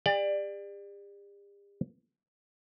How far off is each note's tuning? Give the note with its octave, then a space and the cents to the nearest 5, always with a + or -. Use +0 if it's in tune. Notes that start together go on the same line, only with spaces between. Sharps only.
G4 +45 D5 +20